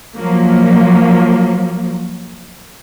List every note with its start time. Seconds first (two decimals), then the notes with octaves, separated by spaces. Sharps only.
0.17 F3 F#3 A#3